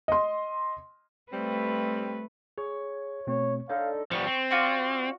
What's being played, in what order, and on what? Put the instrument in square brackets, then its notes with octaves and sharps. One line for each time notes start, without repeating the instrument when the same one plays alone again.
[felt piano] D#5 C6
[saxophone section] G3 C4 [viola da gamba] A3 B4
[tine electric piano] G#4 [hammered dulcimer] C#5
[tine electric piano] B2 A3 C4 [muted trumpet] C#5
[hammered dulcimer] D3 D#4 A4 [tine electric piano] C#5 [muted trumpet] F5
[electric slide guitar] F3 G3 B3 [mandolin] C#6
[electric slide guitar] C4
[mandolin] F4 F#4 D5